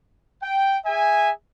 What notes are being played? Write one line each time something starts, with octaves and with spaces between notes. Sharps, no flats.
G5
G#4 E5 G#5